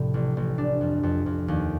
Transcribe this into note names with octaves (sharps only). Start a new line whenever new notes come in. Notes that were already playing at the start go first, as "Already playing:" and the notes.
Already playing: C2 A2 C3 F3
A1
A1
D4
F2
F2
F2
D#2